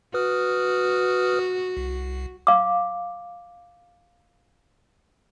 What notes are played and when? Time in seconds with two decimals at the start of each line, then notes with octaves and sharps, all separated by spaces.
0.14 F#4 B4 D#6 F6
1.77 C2
2.47 F5 D6